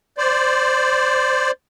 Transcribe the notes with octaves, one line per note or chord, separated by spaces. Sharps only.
C5 D5